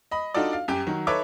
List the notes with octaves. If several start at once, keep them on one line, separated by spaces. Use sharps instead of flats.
D#5 B5
D4 D#4 F4 F#4 A4 D5
F5
F#2 G4
D#3 F#3
D#4 A4 B4 C#5 E5 D6